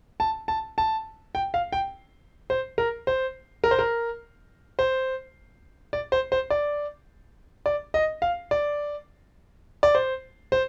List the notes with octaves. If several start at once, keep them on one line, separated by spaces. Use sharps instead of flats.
A5
A5
A5
G5
F5
G5
C5
A#4
C5
A#4
C5
A#4
C5
D5
C5
C5
D5
D5
D#5
F5
D5
D5
C5
C5